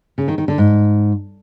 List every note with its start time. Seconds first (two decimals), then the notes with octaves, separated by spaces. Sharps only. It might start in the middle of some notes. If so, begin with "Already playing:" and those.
0.18 C#3
0.28 D#3
0.38 D#3
0.48 D3
0.58 G#2